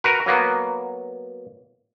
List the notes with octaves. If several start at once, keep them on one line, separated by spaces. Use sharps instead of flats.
F#4 A#4 B4
F#3 A#3 B3